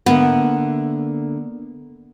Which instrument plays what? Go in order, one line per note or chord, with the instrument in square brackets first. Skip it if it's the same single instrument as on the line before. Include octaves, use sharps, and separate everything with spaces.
[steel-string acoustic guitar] D3 A#3 E5 [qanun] B3